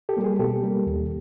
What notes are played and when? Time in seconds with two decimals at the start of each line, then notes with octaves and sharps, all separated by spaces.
0.09 G4 A4
0.17 G3 A#3
0.24 G#4
0.39 B2 G4 A4
0.63 G3 A#3
0.87 D#2